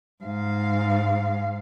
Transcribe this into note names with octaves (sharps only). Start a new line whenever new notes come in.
G#2 F5